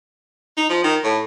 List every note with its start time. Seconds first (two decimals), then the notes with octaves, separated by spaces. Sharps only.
0.57 D#4
0.69 F3
0.84 D#3
1.04 A2